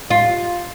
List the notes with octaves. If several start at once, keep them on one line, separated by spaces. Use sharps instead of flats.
F4